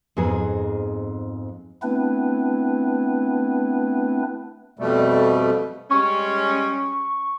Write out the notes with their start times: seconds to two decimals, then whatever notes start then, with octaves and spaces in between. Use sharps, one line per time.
0.17 F2 G#2 B3 G#4
1.82 A3 B3 C4 D4 E4 B4
4.79 F2 B2 G3 A3
5.91 G3 G#3 C#4 C#6